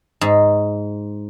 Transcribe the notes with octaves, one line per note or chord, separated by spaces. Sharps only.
G#2